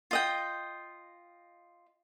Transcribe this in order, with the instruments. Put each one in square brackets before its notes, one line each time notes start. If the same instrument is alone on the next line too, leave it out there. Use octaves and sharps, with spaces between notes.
[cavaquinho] F4 D#5 G5